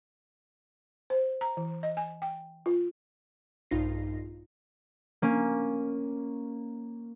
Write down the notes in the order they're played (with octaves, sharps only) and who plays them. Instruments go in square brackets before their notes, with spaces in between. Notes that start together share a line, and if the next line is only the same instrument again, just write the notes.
[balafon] C5
A#5
E3
D#5
G#5
G5
F4
[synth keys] A#1 G2 D#4 F4 A#6 C7
[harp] A#3 C#4